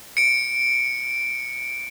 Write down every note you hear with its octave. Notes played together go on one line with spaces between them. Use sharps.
C#7 D7